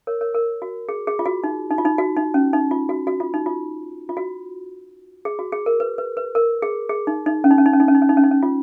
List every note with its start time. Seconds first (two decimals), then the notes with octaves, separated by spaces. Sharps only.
0.07 A#4 C#5
0.21 A#4 C#5
0.35 A#4
0.62 F#4
0.89 G#4
1.07 G#4
1.19 F4
1.26 F#4
1.44 D#4
1.71 D#4
1.78 F4
1.85 D#4
1.98 F#4
2.17 D#4
2.34 C#4
2.53 D#4
2.71 F4
2.89 F#4
3.07 F#4
3.20 F4
3.34 D#4
3.46 F4
4.09 F4
4.17 F#4
5.25 G#4
5.39 F#4
5.52 G#4
5.66 A#4
5.80 B4
5.98 B4
6.17 B4
6.35 A#4
6.62 G#4
6.89 G#4
7.07 D#4
7.26 D#4
7.44 C#4
7.51 D#4
7.58 C#4
7.66 D#4
7.73 C#4
7.80 D#4
7.88 C#4
7.95 D#4
8.02 C#4
8.09 D#4
8.17 C#4
8.24 D#4
8.31 C#4
8.43 F4